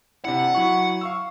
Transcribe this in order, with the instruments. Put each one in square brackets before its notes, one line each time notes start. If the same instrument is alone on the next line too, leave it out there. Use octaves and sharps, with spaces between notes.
[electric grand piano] C3 D4 E4 [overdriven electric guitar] F#5
[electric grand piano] F#3 E4 C#6
F5 C#6 E6